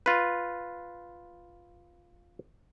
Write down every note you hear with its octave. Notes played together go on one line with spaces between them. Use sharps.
F4 B4